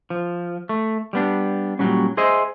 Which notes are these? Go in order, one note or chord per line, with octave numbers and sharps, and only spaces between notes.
F3
A3
G3 B3 D4
A#2 E3 F#3 G3 C#4
G#4 C5 D#5 E5